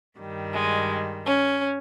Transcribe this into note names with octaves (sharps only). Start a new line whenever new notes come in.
G2 D#3 G3
G#3
C#4